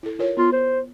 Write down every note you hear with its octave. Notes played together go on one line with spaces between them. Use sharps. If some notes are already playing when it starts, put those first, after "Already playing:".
E4 A4
F4 A#4 C#5
B3 F4
C5